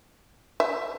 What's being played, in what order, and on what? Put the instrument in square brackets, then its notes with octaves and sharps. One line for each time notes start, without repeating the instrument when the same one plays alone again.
[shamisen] E5